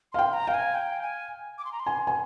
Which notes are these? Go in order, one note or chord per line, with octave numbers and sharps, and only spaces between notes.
F5 C6
G5
A#5
F5 G5
G#5
G5
G#5
D6
C6
A#5
C6
G#5
G#5